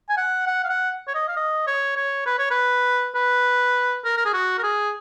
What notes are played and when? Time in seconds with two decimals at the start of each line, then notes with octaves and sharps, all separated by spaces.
0.09 G#5
0.17 F#5
0.46 F#5
0.64 F5
0.69 F#5
1.07 C#5
1.15 D#5
1.28 F5
1.36 D#5
1.67 C#5
1.96 C#5
2.26 B4
2.38 C#5
2.51 B4
3.15 B4
4.04 A#4
4.17 A#4
4.25 G#4
4.33 F#4
4.58 A#4
4.63 G#4